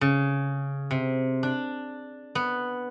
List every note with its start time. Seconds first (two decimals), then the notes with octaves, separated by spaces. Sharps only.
0.01 C#3
0.91 C3
1.43 D4
2.35 B3